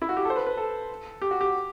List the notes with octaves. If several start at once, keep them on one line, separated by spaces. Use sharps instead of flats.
E4
F#4
G4
A4
C5
B4
B4
A4
G4
F#4
G4